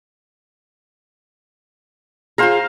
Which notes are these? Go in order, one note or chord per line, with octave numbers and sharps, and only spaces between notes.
F4 G#4 C5 F5 A#5